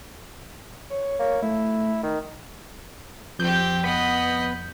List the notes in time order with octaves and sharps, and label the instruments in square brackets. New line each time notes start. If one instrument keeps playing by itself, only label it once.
[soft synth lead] C#5
[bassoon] A#3 [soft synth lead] C#5
[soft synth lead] A3 [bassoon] E4
[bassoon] D#3
[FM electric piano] F2 G6 [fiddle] C4 G4
[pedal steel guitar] B3 B4 [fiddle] D#5 B5